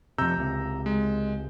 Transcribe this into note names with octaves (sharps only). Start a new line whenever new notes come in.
F2 C3 A#5 E6 G6
C#2 C3
G#3